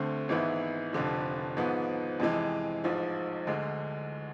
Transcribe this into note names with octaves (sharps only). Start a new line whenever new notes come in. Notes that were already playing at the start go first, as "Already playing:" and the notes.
Already playing: D2 D3 A3 C4
G#1 G#2 E3 B3 E4
F1 F2 D3 F3
G#1 G#2 F3 B3
F2 C3 E3 G#3
A1 G#2 F3
D2 D3 G#3